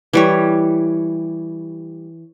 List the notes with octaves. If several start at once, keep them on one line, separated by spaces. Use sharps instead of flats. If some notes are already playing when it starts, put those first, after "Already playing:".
E3 G3 C#5